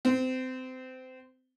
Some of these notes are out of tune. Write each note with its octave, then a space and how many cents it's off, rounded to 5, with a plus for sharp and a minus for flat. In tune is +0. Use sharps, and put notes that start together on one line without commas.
C4 -25